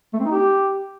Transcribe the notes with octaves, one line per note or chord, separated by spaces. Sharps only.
A3
C4
D#4
G4